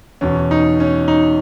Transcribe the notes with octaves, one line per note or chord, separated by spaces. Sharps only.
E2 B2 C#4
D#4
C#4
D#4